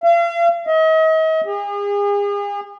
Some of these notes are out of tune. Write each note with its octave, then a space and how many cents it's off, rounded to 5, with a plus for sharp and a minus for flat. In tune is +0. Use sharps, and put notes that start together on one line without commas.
F5 -40
D#5 +40
G#4 -40